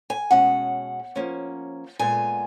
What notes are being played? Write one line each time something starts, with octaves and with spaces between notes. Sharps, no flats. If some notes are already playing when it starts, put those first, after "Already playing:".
G#5
B2 G#3 C#4 F#5
F3 A#3 C#4
A#2 G#3 B3 G#5